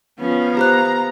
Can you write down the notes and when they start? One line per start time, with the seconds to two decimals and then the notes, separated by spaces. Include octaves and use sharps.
0.19 F3 B3 C#4 F5
0.57 G4 C5 A#5 F#6